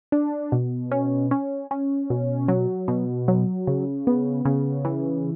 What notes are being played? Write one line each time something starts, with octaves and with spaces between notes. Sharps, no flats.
D4
B2
C#4
C#4
C#4
B2
F#3
B2
F#3
C#3
B3
C#3
E3